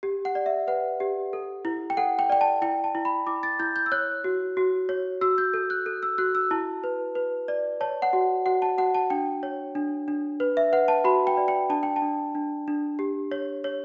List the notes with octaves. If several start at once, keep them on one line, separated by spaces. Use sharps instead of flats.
G4
F#5
D5
E5
B4 F#5
G4
A4
E4
G5
A4 F#5
G5
D5 G5
A5
E4 G5
A5
E4
B5
E4 D6
A6
E4 G6
G6
E6
C#5 F#6
F#4
F#4
C#5
F#4 E6
G6
A4
F#6
A4
E6
F#4 F#6
E6
E4 A5
B4
B4
D5
C#5 A5
F#5
F#4
F#4 F#5
A5
F#4 F#5
A5
D4 G5
C#5
D4
D4
B4
E5
B4 F#5
A5
F#4 B5
G5
D5
G5
D4 A5
G5
A5
D4
D4
D4
G4
C#5
C#5